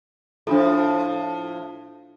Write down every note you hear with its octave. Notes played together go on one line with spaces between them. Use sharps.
A2 F3 D4 F4 A4